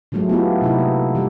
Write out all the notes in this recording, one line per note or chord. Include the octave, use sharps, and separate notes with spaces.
D3 F3 F#3 G#3 A3
B3 E4 F4 G4
C3 D#4 E4
A#3
F3 G3 G4